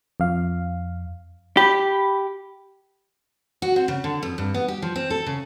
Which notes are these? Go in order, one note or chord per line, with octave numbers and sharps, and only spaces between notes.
F2 F5
G4 B5
F#4
C4
C#3
D3
F2
G2
B3
G4
F3
C4
A4
C#3